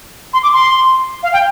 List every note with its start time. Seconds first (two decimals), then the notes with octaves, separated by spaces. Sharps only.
0.33 C6
0.43 D6
0.53 C6
1.23 F5
1.33 G5